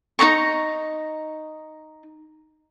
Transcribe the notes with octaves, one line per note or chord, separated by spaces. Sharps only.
D#4 C5 A#5 C#6